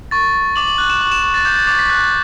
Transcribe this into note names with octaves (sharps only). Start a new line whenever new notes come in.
C#6 A6
C#6
D6 F#7
F#7
F#6
E7
C#6 F#7
E7
C#6 E7
A6
D6 G6
A6
D6 A6
B6
F#6 A6